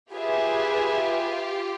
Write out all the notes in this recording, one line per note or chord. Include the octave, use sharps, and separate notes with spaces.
F4 G4 G#4 B4 E5 G#5